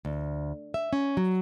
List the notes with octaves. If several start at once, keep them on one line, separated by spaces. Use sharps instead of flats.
D2
E5
C#4
F#3